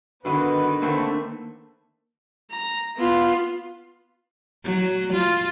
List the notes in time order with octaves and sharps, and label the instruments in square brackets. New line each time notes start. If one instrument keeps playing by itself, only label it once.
[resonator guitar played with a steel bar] G2 D3 D#5 [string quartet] D#3 B3 [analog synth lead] F#4 [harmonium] B4
[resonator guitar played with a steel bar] D3 A3 C4 [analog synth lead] A#3
[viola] A#5
B3 F4
[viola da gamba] F#3
F4